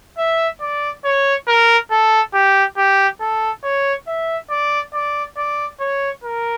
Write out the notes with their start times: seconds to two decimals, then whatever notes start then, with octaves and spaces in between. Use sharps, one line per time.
0.18 E5
0.61 D5
1.05 C#5
1.48 A#4
1.91 A4
2.34 G4
2.77 G4
3.21 A4
3.64 C#5
4.07 E5
4.50 D5
4.94 D5
5.37 D5
5.80 C#5
6.24 A#4